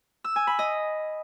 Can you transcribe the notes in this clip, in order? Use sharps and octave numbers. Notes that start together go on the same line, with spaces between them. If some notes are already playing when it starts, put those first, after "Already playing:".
E6
G#5
B5
D#5